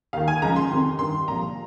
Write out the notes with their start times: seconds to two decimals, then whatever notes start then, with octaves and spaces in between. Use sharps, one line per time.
0.13 D#2 D#3 F5
0.28 G#5
0.42 C#2 C#3 F3 A#5
0.56 C6
0.71 F2 C3 D#3
0.99 G2 D#3 C6
1.28 C2 A#2 F3 A#5